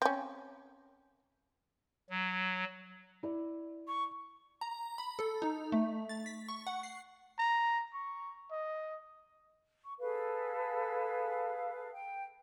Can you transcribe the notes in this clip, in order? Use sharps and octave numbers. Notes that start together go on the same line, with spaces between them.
C4 C#4
F#3
E4 D5
C#6
A#5
B5
A4
D#4
A3
A6
B6
C#6
F#5
C7
A#5
C#6
D#5
C#6
G#4 A4 B4 F5
G5